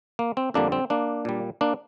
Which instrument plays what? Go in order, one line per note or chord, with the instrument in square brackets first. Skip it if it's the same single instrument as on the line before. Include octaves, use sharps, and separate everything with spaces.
[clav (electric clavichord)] A#3
C4
F2 D3 G3 A#3 D4
C4
A#3 D4
A#2 G3
A#3 D4